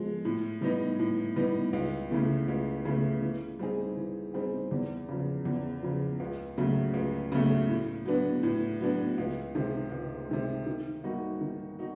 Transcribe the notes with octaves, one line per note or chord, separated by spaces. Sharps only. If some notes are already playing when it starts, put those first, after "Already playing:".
Already playing: F3 G#3
A2
E3 G3 B3 D#4
A2
E3 G3 B3 D#4
C#2
C#3 E3 A3
C#2
C#3 E3 A3
E3
G3 C4 D#4 G#4
E3
G3 C4 D#4 G#4
E2
C#3 F3
E2
C#3 F3
C#2
C#3 F#3 A3
C#2
C#3 F#3 A3
A2
F#3 B3 D4
A2
F#3 B3 D4
C#2
C3 D#3 G#3
C#2
C3 D#3 G#3
D#3
G3 A#3 D#4 F#4
D#3
D#4 F#4